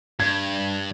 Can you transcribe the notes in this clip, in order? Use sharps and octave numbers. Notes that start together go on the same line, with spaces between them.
G2 G#6